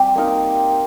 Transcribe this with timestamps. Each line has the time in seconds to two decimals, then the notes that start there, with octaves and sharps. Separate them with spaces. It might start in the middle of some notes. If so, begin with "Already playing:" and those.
Already playing: G3 C4 G4
0.16 A#3 D#4 A#4